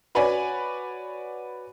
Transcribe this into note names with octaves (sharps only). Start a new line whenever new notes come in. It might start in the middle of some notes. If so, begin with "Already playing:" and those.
F#4 B4 C#5 D5 G#5 B5